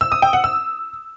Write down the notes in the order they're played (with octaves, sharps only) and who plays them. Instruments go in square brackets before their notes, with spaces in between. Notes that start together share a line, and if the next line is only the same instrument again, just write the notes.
[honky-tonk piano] E6
D#6
G5
F#5
E6